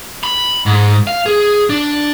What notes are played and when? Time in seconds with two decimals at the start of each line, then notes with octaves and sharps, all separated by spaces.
0.23 B5
0.66 G#2
1.07 F5
1.26 G#4
1.70 D4